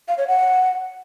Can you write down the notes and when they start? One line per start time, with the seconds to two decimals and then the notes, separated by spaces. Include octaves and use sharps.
0.08 F5
0.18 C#5
0.27 F#5